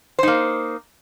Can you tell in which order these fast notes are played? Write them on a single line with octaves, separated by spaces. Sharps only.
C5 D#4 A#3